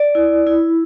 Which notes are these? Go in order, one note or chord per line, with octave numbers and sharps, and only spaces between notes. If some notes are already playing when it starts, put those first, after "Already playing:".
Already playing: D5
E4
E4